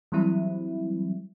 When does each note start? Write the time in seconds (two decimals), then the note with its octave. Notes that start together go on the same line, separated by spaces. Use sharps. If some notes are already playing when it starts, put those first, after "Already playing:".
0.12 E3 F#3 G3 C4 E4